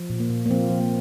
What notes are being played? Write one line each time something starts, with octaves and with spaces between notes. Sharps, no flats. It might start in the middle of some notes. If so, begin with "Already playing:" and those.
Already playing: F3
A#2
A#3
A#2
A#3
F3 C4
F3
A#3